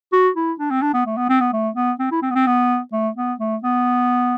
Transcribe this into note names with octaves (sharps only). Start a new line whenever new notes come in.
F#4
E4
D4
C4
D4
B3
A3
B3
C4
B3
A3
B3
C4
E4
C4
B3
C4
B3
A3
B3
A3
B3